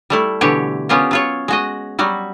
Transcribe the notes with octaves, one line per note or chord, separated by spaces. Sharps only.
G3 A3 E4
B2 D3 E3 G4 C#5
B3 C#4 F4 G4 A#4
F#3 F4 C#5
G#3 F#4 D#5
F#3 G3 F#4